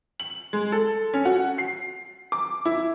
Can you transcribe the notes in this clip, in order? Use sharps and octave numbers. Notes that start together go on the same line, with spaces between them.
F#7
G#3
A4
C#4
F#4
C7
D6
E4